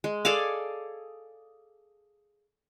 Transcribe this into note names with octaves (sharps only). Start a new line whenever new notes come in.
G#3
G#4 A4 D5 F5